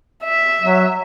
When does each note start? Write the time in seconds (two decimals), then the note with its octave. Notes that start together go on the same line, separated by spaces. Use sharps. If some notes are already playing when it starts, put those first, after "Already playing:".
0.24 E5
0.62 F#3